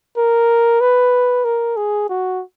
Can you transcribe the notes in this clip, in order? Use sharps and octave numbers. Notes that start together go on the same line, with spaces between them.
A#4
B4
A#4
G#4
F#4